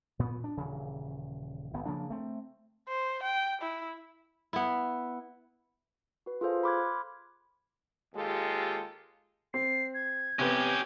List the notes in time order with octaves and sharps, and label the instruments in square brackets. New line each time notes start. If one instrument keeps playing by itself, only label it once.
[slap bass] A#2 B3
D4
D#1 C#3 E3
G1 B3
C#3 F3 A#3 D4
A3 C4
[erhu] C5
G5
E4
[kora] B3 E4
[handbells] F#4 B4
F4 G#4 A4 C5 F5
B5 C6 D6 F6 F#6 G#6
[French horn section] D#2 G#3 F4 G4 A4
[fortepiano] C4 [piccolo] C7
[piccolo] G#6
[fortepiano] C3 B3 [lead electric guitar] C#4 G4